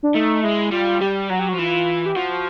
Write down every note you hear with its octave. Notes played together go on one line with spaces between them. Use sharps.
D4
A3 D#4
G#3 E4
G3 F4
G3 G4
F#3 F#4
G4
F#4
F3
E3 F4
G4
F3 F#4